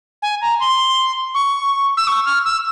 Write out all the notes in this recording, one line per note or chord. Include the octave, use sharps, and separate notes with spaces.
G#5
A#5
C6
C#6
E6
C#6
F6
E6